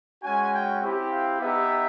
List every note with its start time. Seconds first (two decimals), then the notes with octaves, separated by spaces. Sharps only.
0.23 G#3 C#4 F#4 G#5
0.53 G5
0.82 C4 E4 G4
1.12 F5
1.41 B3 D#4 G4 E5